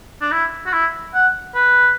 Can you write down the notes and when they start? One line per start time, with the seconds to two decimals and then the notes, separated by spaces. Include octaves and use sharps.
0.21 D4
0.32 E4
0.66 F#4
0.73 E4
1.14 F#5
1.55 B4